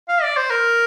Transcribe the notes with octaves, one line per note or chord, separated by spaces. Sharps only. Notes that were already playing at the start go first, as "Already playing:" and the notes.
F5
D5
C5
A#4